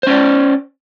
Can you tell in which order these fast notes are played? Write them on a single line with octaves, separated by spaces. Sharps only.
C5 C#4 D5